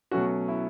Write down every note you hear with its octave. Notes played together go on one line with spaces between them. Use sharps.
B2 F#3 A3 C#4 F#4
E4